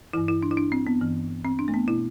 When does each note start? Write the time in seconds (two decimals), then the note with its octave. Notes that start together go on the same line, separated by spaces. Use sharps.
0.13 G2 E3 E4
0.28 E4
0.43 D4
0.51 E4
0.57 D4
0.72 C4
0.87 B3
1.01 G2 E3
1.45 C4
1.59 D4
1.68 A3
1.74 B3
1.88 B2 E4